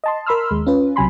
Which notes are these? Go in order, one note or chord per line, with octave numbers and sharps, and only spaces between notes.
D#5 A5 C6
A#4 B5 C6 E6 F6
D#2 G#3
C#4 F4 B4
B1 C3 F#3 G#5 B5 C6